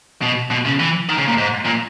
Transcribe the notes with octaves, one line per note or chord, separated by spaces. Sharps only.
B2
B2
C#3
E3
D#3
C#3
A#2
G#2
A#2